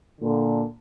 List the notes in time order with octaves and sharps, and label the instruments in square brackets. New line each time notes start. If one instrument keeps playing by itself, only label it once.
[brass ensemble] A#2 D3